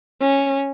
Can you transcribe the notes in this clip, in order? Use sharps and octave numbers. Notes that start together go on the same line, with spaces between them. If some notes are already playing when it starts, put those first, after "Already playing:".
C#4